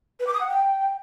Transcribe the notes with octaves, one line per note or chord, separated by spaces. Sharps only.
B4
D6
D#6
F#5
G5